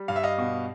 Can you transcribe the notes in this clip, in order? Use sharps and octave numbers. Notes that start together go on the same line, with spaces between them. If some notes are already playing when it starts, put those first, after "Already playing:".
Already playing: G3
G2 F5
E5
D#5 F5
B2